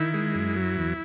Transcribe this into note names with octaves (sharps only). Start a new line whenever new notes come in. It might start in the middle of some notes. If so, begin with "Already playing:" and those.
Already playing: D#3 E4
G#3
F#2
F#3
E2